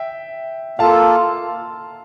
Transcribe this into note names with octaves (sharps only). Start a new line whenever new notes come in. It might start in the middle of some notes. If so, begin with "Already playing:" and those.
Already playing: E5 G5
A#3 F4 A4 F5 A5